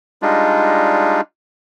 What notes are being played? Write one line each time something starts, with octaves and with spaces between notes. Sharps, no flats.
G3 G#3 D4 D#4 F4